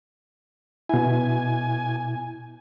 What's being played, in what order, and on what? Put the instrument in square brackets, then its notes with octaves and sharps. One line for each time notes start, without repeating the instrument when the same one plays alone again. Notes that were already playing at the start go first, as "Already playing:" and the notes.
[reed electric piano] B2 E4 [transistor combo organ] G#5